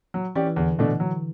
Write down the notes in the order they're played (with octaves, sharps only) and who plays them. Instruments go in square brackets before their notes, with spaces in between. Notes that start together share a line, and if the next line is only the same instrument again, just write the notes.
[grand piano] F#3
[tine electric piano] E3 [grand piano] C#4 G4 D5
[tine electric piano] E3
[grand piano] E2 [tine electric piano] D3
[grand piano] B2 A3 D4
F#3